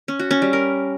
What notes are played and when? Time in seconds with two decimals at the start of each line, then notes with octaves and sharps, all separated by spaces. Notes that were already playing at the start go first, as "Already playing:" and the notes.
0.08 C#4
0.19 F#4
0.31 C#4
0.42 G3
0.53 A#4